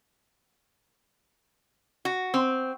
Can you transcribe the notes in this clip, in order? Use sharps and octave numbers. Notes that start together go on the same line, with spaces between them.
F#4
C4